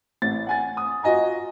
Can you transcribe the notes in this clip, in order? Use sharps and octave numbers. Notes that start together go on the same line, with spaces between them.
A1 A6
F#5 G#5 A6
D#6
F4 F#4 D#5 G#5 A#5